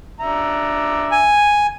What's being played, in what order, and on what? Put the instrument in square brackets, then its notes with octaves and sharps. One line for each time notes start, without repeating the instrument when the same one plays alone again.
[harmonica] D4 E5 A#5
[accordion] G#5